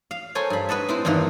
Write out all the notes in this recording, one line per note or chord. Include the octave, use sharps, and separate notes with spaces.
F5
A4 A#4 C5 C#5 G#5 A5
G2 B5
B4 D#5 F#5 A5
C4 E4 C5
E2 G2 D#3 A#3 A#4 F#5